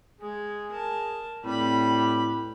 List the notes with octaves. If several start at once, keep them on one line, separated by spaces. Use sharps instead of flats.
G#3 G#4
A#4 A5
A2 G3 C4 B4 B5